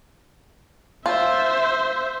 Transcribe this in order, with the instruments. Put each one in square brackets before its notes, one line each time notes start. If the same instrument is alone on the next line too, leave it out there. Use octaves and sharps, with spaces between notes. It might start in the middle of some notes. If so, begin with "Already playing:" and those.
[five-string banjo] F4 [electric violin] C5 E5